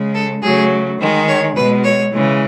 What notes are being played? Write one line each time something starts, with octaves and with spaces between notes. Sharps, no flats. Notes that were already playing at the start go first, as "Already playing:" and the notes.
Already playing: C#3 G#3
A4
C#3 F#3 A3 G#4
D#3 G#3
C#5
B2 G#3 B4
C#5
C#3 E3 G#3